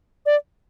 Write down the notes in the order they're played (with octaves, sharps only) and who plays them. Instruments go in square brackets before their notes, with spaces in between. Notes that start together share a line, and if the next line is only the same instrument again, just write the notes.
[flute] D5